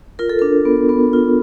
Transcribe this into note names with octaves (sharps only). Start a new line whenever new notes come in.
F4 A#4
A4
D4 A#4
B3
B3
F4